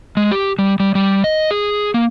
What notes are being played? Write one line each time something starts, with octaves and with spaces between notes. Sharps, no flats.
G#3
G4
G3
G3
G3
D#5
G#4
A#3